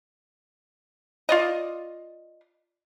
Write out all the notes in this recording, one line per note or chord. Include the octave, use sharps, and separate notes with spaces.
F4 D5 D#5